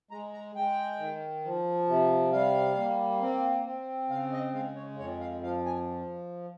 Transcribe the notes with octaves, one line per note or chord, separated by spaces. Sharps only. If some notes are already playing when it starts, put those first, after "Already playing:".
G#3 A#5
A#5
G#3 G5
D#3
F3
C3
G3 F5
A#3
C4
C4
C#3 F5
D#5
G#3 F5
C#5
F2 C#5
F5
F3 F5
G#5